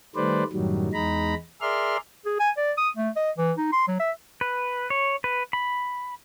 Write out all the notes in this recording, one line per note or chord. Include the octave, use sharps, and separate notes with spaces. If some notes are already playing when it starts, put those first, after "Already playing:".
D#3 G3 A3 B4 C5 D5
F#2 A2 D#3 F#3 G3
E2 G#3 D#4 A#5 B5
G#4 A#4 D5 E5 C6 F6
G#4
G#5
D5
D#6
A3
D#5
E3
D#4
C6
F#3
E5
B4
C#5
B4
B5